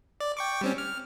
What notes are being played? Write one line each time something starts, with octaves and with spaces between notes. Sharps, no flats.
D5
G5 C#6 D6
G3 C4 C#4
F6